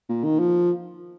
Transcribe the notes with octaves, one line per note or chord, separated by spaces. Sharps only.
A#2
D#3
F3